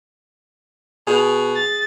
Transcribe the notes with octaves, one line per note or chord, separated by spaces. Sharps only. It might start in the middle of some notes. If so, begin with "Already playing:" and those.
B2 G#4
A6